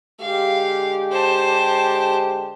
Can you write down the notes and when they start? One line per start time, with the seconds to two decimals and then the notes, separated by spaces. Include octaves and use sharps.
0.21 D3 G#3 G4 F5
1.13 C5 A5